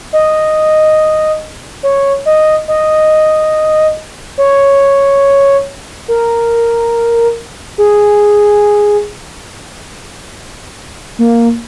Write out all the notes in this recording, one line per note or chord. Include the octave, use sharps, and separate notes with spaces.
D#5
C#5
D#5
D#5
C#5
A#4
G#4
A#3